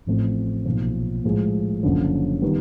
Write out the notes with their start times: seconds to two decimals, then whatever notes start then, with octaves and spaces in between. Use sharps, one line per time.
0.06 A1 A2 F3 A3 C4
0.65 B1 A#2 F3
1.24 A2 F3 G#3
1.83 F#1 F#2 D3 F3
2.42 D#3 G3 B3